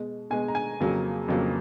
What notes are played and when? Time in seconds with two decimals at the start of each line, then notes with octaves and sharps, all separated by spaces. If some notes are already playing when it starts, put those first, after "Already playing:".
Already playing: B2 G#3
0.30 B2 G#3 G#5
0.48 A#5
0.55 G#5
0.80 F2 C#3 F#3 A#3
1.28 F2 C#3 F#3 A#3